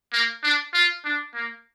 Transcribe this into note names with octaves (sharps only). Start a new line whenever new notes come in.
A#3
D4
F4
D4
A#3